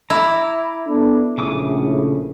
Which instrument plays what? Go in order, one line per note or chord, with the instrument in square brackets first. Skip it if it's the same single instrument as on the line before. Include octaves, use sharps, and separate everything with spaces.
[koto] E4 [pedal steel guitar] A#5 D6
[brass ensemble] B3 D4 A4
[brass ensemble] A#1 A2 [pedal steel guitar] C#3 D6 D#6